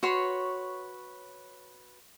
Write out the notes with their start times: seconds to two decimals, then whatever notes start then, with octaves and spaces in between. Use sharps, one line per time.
0.03 F#4 B4 C#5 C6